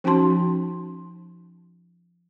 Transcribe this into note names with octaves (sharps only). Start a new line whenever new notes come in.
F3 C#4 D#4 F#4 A5 C6